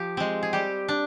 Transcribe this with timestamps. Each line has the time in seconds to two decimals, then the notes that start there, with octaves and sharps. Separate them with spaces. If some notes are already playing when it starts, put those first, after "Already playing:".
Already playing: F3 G4
0.17 G#3 C4
0.43 G#4
0.53 G3 G4
0.88 D4